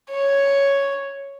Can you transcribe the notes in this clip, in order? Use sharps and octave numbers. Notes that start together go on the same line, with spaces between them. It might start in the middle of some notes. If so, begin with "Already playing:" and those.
C#5